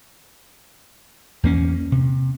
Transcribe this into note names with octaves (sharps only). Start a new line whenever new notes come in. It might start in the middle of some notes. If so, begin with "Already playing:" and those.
E2 A#3 C#4
C3